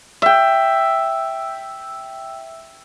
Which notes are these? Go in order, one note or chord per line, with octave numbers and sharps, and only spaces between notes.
E5 G5